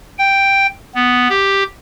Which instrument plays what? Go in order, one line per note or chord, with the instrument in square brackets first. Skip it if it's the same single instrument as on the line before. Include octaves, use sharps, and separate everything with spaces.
[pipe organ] G5
B3
G4